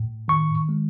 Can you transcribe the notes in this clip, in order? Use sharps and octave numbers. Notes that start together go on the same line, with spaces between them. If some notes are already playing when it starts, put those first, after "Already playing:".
Already playing: A2
D#3 C#6
G#3